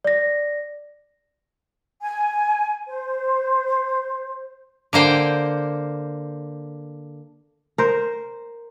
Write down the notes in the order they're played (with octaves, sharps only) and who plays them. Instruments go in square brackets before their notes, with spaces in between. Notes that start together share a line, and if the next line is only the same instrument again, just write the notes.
[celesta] D5 A#6
[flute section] G#5
C5
[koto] D3 A#3 C5 G5
[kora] A#4 C5